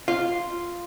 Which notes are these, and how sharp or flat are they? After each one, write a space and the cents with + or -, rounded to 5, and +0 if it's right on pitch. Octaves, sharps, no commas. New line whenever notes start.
F4 -5